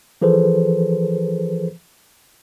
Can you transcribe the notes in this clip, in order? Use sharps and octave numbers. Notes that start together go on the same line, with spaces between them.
E3 F3 G#4 A4 B4 C5